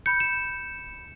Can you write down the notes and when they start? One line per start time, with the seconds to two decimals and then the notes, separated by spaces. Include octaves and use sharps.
0.06 B5 G6 C#7
0.20 E7